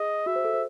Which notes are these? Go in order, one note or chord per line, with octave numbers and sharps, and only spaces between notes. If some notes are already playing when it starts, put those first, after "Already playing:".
Already playing: G#4 D#5
F#4 E5
C5
A4
C5